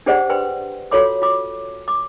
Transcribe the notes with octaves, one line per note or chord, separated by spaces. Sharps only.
D4 G4 G#4 C5 D5 F#5
B4 G5 C6
F4 F#4 A4 C#5 C6 D6
F4 D6
D6